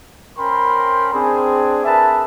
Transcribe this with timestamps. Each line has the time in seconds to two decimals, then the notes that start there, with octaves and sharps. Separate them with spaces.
0.38 C#4 A#4 C5 G5 B5 C6
1.13 C4 D4 G#4
1.84 G#4 A#4 B4 E5 A5